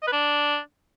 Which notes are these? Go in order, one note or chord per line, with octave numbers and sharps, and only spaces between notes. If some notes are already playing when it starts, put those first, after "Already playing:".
D#5
B4
D4